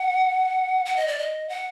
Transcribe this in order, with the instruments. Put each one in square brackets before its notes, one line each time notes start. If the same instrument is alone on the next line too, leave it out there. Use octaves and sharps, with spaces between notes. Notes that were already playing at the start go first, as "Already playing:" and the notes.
Already playing: [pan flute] F#5
F#5
D#5
D5
D#5
F#5